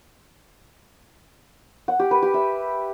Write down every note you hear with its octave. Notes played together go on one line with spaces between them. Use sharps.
F#5
G4
B4
G4
E5